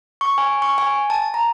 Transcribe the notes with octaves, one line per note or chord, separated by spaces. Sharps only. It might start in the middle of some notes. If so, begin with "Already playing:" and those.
C#6
G#5
C#6
G#5
A5
A#5